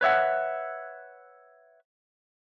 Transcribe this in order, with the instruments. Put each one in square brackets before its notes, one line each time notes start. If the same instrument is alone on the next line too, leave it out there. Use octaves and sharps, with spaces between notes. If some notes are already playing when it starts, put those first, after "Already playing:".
[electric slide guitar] B4 C#5 E5 F#5